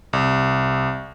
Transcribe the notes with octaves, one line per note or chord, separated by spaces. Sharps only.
C2